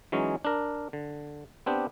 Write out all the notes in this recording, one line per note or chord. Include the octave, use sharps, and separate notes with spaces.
E3 F#3 G#3 C#4 D#4
D4 A#4
D3
B3 C4 D4 G4